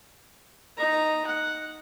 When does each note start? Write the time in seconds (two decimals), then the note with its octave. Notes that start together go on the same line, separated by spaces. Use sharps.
0.77 D#4 A#5
1.27 F#5